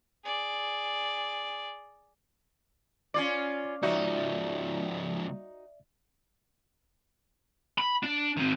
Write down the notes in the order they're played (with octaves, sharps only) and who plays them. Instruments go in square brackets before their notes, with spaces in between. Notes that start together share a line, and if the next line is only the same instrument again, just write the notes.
[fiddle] G#4 D5
[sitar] C#4 F4 D5 [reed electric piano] D6
[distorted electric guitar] C#2 F3 [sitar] D#4 F#4 [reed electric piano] D5 E5
[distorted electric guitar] B5
D4
D#3 C4